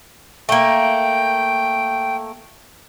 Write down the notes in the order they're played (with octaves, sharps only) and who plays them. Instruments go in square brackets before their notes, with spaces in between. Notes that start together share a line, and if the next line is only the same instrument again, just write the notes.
[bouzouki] A3 A#3 [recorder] G5